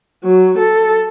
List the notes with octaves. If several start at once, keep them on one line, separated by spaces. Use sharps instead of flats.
F#3
A4